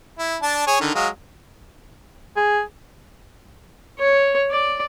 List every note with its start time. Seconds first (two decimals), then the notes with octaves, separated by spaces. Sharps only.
0.18 E4
0.42 D4 A5
0.67 G#4 C#5
0.81 D3 D#3
0.95 F#3 G#3 F5
2.37 G#4
3.99 C#5
4.51 D5